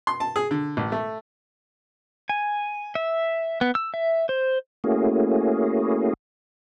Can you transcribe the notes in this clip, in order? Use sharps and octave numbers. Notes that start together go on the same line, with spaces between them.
C6
A5
G#4
D3
A1
A3
G#5
E5
B3
E6
E5
C5
A3 A#3 C#4 E4 F#4 G#4